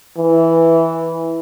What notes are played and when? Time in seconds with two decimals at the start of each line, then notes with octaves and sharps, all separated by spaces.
0.18 E3